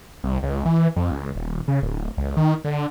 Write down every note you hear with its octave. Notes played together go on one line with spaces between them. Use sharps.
C2
C#2
E3
F2
C#2
D#1
C#3
D1
C#2
D#3
D3